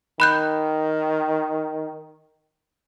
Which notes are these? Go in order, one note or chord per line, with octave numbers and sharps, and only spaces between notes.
D#3 B5 F#6 G6